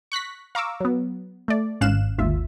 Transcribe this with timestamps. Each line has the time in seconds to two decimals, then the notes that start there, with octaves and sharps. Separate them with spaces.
0.12 C#6 F#6 A#6 B6
0.55 F5 A#5 C#6 D6 E6
0.80 F#3 B3
1.48 A3 D5
1.81 G#1 C#4 F5 F#6 E7
2.18 G#1 D#2 F4 E5